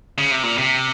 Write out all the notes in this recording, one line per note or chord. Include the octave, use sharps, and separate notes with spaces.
C#3
C3
A#2
C3